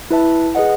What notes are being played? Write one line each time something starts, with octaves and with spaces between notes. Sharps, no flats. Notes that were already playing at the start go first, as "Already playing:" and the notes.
E4 B4 E5 A5
G#4 B4 D#5 F#5